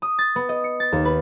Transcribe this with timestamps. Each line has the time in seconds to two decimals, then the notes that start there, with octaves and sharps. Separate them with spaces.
0.02 D#6
0.19 A6
0.36 B3
0.49 D#5
0.64 C#7
0.80 A6
0.92 D#2
1.05 B4